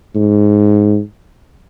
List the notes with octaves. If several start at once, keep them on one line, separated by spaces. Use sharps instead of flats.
G#2